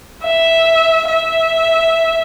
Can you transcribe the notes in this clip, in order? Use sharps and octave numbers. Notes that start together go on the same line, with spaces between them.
E5
E5